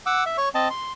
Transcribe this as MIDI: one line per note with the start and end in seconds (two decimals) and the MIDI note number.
0.06 0.24 78
0.06 0.24 86
0.06 0.24 88
0.26 0.37 76
0.38 0.49 73
0.38 0.49 85
0.55 0.69 60
0.55 0.69 75
0.55 0.69 81
0.70 0.92 84